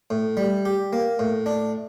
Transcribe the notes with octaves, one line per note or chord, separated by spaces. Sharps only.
A2
G3
G4
A#3
A2
D4